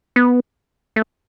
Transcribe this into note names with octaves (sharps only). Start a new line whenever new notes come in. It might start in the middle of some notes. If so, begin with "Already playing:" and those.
B3
A3